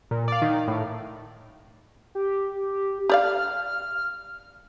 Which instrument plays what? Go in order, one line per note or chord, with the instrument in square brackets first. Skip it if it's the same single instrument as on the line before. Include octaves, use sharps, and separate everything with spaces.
[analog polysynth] A#2
D5 F5
D#3
A2
[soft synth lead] G4
[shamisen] G4 D5 F5 [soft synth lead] F6